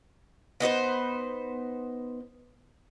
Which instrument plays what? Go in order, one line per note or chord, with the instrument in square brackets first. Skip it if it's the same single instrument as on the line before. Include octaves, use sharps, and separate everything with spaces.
[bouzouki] B3 D#4 B4 C5